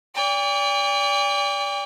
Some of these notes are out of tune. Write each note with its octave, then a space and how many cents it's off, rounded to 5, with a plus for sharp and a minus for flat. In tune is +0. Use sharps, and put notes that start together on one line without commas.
D5 -35 G5 +40